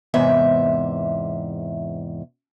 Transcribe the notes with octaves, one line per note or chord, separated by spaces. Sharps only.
E2 G#2 C3 E5